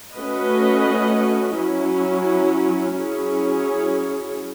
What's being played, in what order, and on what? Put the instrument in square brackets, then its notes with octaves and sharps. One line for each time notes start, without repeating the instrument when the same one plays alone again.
[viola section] A3 C#4 F#4 B4 D#5
F#3 C#4 E4
F#3 C#4 E4 G#4 C#5